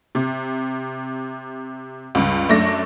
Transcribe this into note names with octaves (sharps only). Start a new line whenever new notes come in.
C3
C#2 G2
F#2 A3 D4 A#6